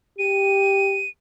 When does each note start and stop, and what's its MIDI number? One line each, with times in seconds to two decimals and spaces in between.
0.19 1.04 67
0.19 1.09 99